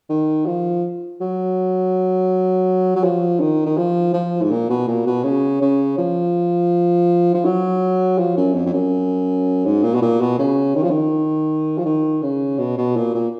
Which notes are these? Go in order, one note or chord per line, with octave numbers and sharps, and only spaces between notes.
D#3
F3
F#3
F#3
F3
D#3
D#3
F3
F3
G#2
A#2
B2
A#2
B2
C#3
C#3
F3
F3
F#3
F3
F#2
F2
F2
F#2
G#2
A#2
B2
A#2
B2
C#3
D#3
F3
D#3
F3
D#3
C#3
B2
B2
A#2
A#2